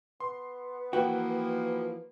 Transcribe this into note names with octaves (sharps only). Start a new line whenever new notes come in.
B3 C6
E3 F3 A#3 F#4 B4 G5